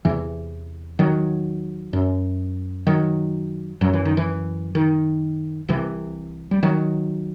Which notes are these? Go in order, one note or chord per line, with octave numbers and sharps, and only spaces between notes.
E2 C3 E3
D#3 F#3
F#2
D#3 F#3
F#2 F#3
E3
D#3
E3
D#3
C2 C3 E3
G3
D#3 F#3